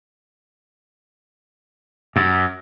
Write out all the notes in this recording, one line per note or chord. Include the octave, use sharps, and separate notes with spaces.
F#2